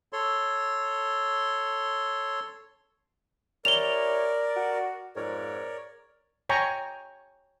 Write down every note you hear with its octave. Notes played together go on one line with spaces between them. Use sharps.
A4 C#5 C6
E4 G4 A#4 C#5 D5 F7 G7
F#4
F2 G#2 A#4 C#5 D5
C#5 G5 G#5 A#5 C#6